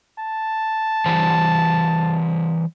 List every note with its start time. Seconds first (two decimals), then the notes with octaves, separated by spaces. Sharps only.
0.19 A5
1.06 E3 G3 C5